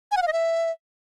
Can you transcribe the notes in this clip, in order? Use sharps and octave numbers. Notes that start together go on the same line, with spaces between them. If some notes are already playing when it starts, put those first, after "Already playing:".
G#5
F#5
F5
D#5
E5